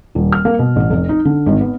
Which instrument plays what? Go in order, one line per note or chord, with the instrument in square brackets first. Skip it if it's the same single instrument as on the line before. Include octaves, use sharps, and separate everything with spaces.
[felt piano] D#1
F6
A#3
B2
A1
F1
D#4
D3
G#1
B3